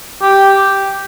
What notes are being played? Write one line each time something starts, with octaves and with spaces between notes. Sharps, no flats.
G4